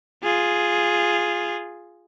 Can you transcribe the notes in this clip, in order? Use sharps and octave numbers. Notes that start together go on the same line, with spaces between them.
F4 G#4